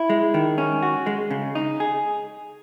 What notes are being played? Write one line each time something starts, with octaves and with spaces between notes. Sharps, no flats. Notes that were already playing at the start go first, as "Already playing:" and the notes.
Already playing: E4
G#3
D#3
C#4
F#4
G#3
C#3
D#4
G#4